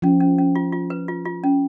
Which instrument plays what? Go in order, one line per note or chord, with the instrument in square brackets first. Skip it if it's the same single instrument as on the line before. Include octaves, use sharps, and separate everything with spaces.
[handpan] F3 [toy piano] C#4
[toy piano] C#4
C#4
F4
F4
B4
F4
F4
C#4